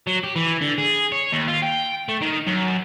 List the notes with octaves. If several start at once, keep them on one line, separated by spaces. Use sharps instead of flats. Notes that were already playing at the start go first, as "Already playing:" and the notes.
F#3
G4
E3
D3
G#4
C#5
D#2
F4
G5
A3
D#3
F#2